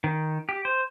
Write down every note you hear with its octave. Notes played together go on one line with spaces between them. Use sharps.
D#3
G4
C5